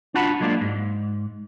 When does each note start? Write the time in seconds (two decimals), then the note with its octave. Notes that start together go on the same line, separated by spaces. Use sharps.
0.14 D4 F4 F#4 F#5 A5 B5
0.40 F#3 G#3 A#3 D4 F4
0.61 G#2